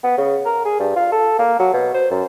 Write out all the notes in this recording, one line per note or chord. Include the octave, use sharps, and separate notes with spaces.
B3
C#3
A#4
G#4
G2
F4
A4
A#3
F#3
B2
C5
F#2